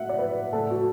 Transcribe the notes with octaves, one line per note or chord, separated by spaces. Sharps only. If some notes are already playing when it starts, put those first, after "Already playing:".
Already playing: A2 F#3 E5 F#5
D5
B4
A2 A3 A4
F#4